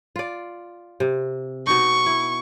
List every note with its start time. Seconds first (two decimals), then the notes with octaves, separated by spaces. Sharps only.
0.16 F4 D5
1.00 C3
1.67 B2 D#4 C#6
2.06 E4